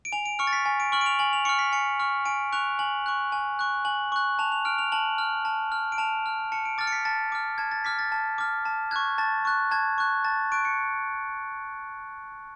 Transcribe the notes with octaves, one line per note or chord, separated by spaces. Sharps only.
D7
G#5 F7
D7
C#6 F6 C#7
A6
B6
G#5
D7
C#6 F6 F#7
D7
F7
G#5 F#7
F7
C#6 F6 C#7
B6
G#5 C#7
C#6 F6
G#5 D7
C#6 F#6 F7
G#5 F#7
C#6 F#6
G#5
C#6 F#6
G#5 F#7
C#6 F#6
A5 F7
F7
F6 D7
F7
A5 F#7
F6
A5
F6
D7
A5 F7
F6
A5 C#7
D7
D6 F6 A6
C#7
B6
A5 A6
D6 F6
A5 G#6
A6
D6 F6 B6
A6
A5
D6 F6
A5
C#6 F#6 G#6
A5 A6
C#6 F#6
A5 G#6
C#6 F#6
A5 A6
C#6 F#6 D7
C#7